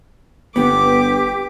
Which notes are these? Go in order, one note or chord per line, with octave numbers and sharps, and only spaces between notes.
G1 B3 G4 D6